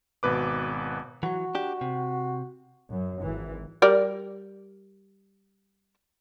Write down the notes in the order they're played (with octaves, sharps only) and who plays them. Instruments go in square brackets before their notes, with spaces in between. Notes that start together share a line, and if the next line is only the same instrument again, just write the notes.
[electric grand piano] G#1 B2 B4 D6
[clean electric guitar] E3 F#3 [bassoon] F#4
[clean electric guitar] D4 G4
C3
[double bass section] F#2
G#1 E3
[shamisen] G3 A#4 D5